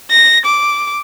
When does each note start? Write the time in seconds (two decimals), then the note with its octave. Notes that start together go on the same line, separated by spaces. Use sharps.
0.11 A#6
0.45 D6